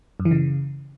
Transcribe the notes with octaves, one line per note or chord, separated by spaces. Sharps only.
F#2
E3
C#3